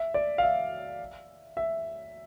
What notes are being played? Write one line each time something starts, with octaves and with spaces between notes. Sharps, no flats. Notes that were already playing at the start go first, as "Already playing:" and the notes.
Already playing: E5
D5
F5
E5
E5